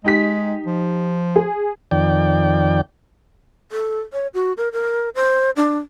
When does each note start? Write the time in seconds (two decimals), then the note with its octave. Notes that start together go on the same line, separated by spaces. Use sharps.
0.04 G#3 D#4 G4 B6
0.66 F3
1.36 G#4
1.91 F2 D#3 D5 G5
3.72 A4
4.13 C#5
4.34 F#4
4.57 A#4
4.73 A#4
5.15 C5
5.56 D4